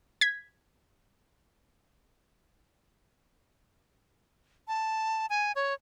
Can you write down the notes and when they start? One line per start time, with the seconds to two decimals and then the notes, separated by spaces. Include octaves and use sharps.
0.21 G#6 B6
4.68 A5
5.30 G#5
5.56 C#5